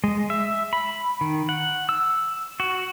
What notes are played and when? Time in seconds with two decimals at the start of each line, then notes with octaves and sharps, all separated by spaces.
0.04 G#3
0.30 E5
0.73 B5
1.21 D#3
1.49 F#5
1.89 E6
2.60 F#4